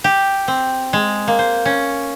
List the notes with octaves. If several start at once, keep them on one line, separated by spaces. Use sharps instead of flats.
G4
C4
G#3
A#3
C5
C#4